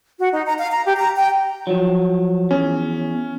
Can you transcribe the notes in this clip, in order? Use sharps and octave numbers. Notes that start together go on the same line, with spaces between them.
F#4
D#4
A#5
F5
A#5
G4
A#5
G5
F3 F#3
E2 C#4